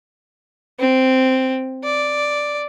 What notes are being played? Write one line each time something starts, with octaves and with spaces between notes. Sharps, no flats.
C4
D5